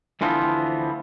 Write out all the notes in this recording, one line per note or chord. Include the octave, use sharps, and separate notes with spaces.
D2 E3 F3 B3 C4